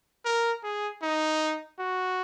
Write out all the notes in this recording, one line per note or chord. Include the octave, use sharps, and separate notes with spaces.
A#4
G#4
D#4
F#4